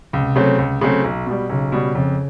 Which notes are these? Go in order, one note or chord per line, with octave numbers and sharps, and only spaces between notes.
C#2 C3
C#3 F#3 A3 C4
C#2
C#3 F#3 A3 C4
B1
B2 G3
B1 C#3
B2 G3
F2 C#3